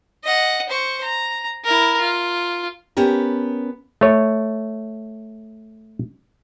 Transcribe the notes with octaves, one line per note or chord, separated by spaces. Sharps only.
D#5 F#5
C5 C#6
A#5
E4 A#4
F4
B3 C#4 G4 A#4
A3 C#5